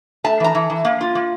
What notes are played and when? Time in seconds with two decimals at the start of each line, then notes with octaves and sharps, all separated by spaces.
0.24 A3 A5
0.40 E3 A#5
0.55 E3
0.70 E3
0.85 A#3
1.01 F4
1.15 A#3